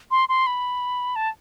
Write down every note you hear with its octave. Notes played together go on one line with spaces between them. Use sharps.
C6
C6
B5
A5